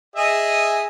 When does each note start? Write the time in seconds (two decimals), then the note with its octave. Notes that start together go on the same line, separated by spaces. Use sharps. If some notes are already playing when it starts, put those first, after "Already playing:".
0.16 G#4 D#5 E5